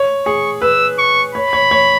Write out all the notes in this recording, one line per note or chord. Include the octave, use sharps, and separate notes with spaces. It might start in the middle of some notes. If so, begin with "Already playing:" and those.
Already playing: C#5
G#4 C#6
B4 E6
C#6
C#5 B5
C#5
C#5